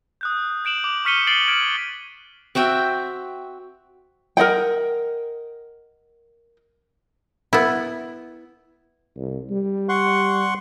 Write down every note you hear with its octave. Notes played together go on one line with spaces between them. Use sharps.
D#6 F#6 G6
G6 D7 E7 F#7
D6
C#6 F6 B6 C#7 D#7 G7
A6 C7 D7 F#7 G7
F6 G#6 B6 D7 E7
C4 F#4 E5 G5
A#4 D#5 F#5 G5
B3 E4
C2
G3
F#5 C6 C#6